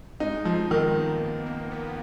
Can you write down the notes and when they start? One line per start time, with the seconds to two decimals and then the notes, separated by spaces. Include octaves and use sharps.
0.20 G#3 D#4
0.45 F3 D#4
0.70 D#3 B3
0.96 A#3
1.21 A#3
1.46 A#3
1.71 B3